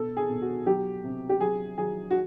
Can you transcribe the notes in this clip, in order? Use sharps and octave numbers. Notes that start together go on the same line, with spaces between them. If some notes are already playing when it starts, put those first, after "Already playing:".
Already playing: B2 A4
G#4
B2
F#4
F#3 G4
C3
G4
F#3 G#4
F#3 G#4
F#4